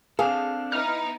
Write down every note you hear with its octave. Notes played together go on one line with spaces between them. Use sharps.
C4 D4 G#4 A4 F5
B3 D#4 E4 F6